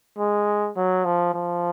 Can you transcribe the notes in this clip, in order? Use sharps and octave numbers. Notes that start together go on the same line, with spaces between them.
G#3
F#3
F3
F3